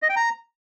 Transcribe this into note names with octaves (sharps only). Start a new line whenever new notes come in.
D#5
G5
A#5